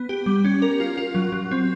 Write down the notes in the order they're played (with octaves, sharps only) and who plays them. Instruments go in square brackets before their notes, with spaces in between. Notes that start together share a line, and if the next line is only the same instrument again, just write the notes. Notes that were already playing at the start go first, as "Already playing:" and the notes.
Already playing: [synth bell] B3
G4
G3
C#4
A#4
F4
F4
F#3
F#3
C4